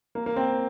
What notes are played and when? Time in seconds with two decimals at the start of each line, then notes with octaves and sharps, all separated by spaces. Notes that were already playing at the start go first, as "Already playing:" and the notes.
0.15 A#3
0.26 A#3
0.36 C4